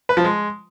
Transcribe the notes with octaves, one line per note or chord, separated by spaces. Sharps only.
B4
F3
G#3